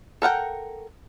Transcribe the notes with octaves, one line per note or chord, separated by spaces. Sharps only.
A4 A#4 F#5 G5